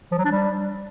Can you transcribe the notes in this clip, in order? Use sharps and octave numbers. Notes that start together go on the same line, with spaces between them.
F3
F#3
D4
G3